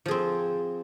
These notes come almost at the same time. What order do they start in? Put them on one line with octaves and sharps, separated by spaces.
F3 G#4 C4